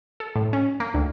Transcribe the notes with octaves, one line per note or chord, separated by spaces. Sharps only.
A4
A2
C#4
A#3
D2